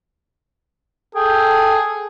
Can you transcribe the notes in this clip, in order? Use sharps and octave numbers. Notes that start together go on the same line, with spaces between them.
G#4 A4 G5